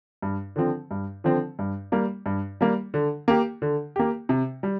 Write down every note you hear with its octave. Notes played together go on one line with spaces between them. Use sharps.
G2
D3 F3 C4
G2
D3 F3 C4
G2
G3 A#3
G2
G3 A#3
D3
A#3 G4
D3
A#3 G4
C3
G3